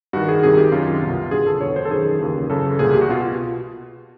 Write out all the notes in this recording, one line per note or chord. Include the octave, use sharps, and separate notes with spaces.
G2 D#3 F#4
G#4
C2 C3 D#3 G#4
G4
F#2 D#3 F4
C2 B2
G2 D3 G#4
A4
E2 B2 C#5
C5
A4
F#2 D#3 G#4
D#2 C#3 E3
F#2 C#3 E3 A4
C2 A#2 G#4
G4
F#4
B2 F4